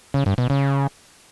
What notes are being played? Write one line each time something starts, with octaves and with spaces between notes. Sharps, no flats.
C#3
G2
B2
C#3